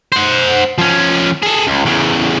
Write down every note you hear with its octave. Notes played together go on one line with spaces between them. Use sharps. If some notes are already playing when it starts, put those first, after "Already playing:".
C5 F#5
F3 C#4
G#4 A4
C#2
E2 C#3